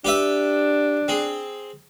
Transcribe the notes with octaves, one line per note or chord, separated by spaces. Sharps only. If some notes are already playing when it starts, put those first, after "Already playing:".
D4 G4 B4 E5
C4 G#4